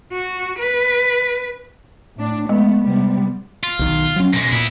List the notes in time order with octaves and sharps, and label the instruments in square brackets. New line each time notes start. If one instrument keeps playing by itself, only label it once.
[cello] F#4
B4
[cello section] A2 D4
[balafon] G#3 [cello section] A3 B3
[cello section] C3 G3 B3
[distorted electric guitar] F4
[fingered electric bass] B1 D#3
F#3 C#4
[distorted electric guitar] F#2 G#3 [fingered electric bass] B2
[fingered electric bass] A#2 [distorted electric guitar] B3 E4